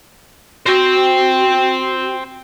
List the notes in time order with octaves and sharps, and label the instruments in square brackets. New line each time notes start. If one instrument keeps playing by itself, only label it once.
[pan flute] F#4 [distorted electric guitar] C5 G5